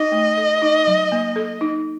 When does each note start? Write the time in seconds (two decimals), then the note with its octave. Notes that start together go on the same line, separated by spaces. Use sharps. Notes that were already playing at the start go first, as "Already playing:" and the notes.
Already playing: D#4 D#5
0.12 A3
0.37 A4
0.62 D#4
0.87 F#3
1.12 A#3
1.36 A4
1.61 D#4